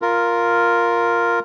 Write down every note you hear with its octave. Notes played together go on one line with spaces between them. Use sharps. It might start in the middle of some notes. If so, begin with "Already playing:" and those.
F4 A#4